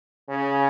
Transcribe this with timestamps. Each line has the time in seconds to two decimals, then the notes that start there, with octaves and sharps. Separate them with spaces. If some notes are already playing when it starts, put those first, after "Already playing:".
0.29 C#3